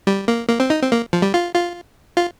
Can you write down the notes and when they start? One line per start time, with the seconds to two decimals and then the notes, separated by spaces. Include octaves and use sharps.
0.07 G3
0.28 A#3
0.49 A#3
0.60 C4
0.70 D#4
0.82 C4
0.92 A#3
1.13 F3
1.22 G3
1.34 F4
1.55 F4
2.17 F4